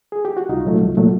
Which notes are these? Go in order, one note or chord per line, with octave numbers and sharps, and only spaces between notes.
G#4
G4
F#4
C2 D#4 F4
A#2 F#3 A3
C2
A#2 F#3 A3